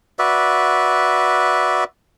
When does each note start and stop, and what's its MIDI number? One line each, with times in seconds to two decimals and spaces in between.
0.19 1.84 66
0.19 1.84 71
0.19 1.84 74
0.19 1.84 76